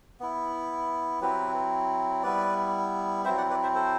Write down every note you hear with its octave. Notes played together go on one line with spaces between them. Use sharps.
B3 E4
F#3 C4 E4 G4 B4
G3 B3 E4 B4 D5
F#3 C4 E4 C5 E5
D5 F#5
B4 D5
C5 E5
A4 C5